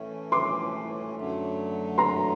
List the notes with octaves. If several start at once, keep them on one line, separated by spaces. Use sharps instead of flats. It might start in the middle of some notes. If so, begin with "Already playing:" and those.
Already playing: A2 E3 A3 C#4
C6 D6
F#2 D3 F#3 A3
A#5 C6